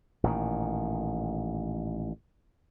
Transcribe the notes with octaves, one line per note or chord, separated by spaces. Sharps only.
A1 A#2 D3 D#3